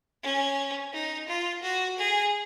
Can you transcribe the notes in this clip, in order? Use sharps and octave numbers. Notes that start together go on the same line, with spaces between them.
C#4
D#4
F4
F#4
G#4